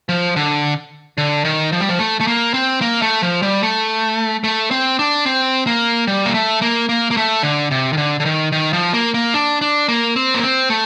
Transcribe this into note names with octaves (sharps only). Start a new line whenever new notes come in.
F3
D3
D3
D#3
F3
G3
F3
A3
A3
A#3
C4
A#3
A3
F3
G3
A3
A3
C4
D4
C4
A#3
G3
A#3
A3
A#3
A#3
A#3
A3
D3
C3
D#3
D3
D3
D#3
D#3
F3
A#3
A#3
D4
D4
A#3
C4
A#3
C4
A3